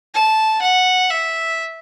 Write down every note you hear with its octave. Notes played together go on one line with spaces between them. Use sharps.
A5
F#5
E5